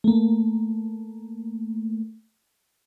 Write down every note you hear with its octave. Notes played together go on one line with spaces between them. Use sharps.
A3 A#3